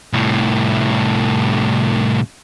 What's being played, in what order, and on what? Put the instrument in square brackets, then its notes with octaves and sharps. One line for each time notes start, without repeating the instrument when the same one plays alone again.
[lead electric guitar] C2 A2